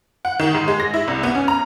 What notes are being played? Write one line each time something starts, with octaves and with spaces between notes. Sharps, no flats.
F#5
D#3
G#2
G#3
A#6
E4
C2
B3
C#4
A#5